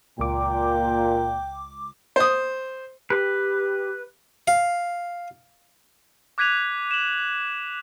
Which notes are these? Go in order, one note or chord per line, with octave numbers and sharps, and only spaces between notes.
C#2 A#2 G5 D6
C5 D#6
G4 B4
F5
D6 F#6 G#6 B6 D#7 F7
E7 F#7